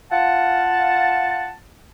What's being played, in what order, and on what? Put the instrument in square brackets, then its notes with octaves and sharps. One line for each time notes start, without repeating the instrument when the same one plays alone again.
[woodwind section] F4 F#5 A5